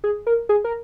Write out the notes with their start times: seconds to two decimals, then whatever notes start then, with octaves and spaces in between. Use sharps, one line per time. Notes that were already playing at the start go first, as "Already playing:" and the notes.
0.04 G#4
0.27 A#4
0.49 G#4
0.64 A#4